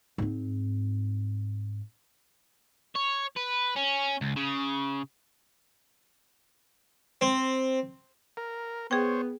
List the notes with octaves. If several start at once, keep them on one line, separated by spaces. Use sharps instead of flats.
G#2 C4
C#5
B4
C#4
C#2
C#3
C4
A#4
B3 G#4 C5 C#5 G5